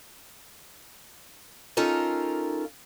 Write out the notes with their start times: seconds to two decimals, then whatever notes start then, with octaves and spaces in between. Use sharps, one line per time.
1.77 C#4 D#4 F4 A4 A#4